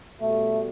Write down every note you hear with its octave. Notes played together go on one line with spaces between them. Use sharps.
B2 G3 A3